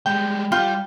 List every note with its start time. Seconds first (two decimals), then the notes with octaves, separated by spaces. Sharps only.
0.06 G3 G#3 G5
0.52 G3 F4 G5